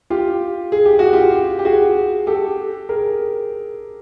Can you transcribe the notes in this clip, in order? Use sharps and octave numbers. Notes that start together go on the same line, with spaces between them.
F4 G4
G#4
G4
F#4
F4 G4
G4
F#4 G#4
G4 A4
G#4 A#4